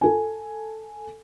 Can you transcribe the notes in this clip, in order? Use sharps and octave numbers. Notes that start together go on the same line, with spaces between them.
A4 G#5